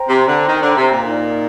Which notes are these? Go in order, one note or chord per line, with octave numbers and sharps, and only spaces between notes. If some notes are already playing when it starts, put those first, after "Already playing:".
Already playing: C5 G5 A#5
C3
D3
D#3
D3
C3
A#2
D#4 A#4 D5